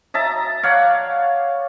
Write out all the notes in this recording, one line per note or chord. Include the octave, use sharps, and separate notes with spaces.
D#5 E5 A5 A#5
C#5 D5 F5 F#5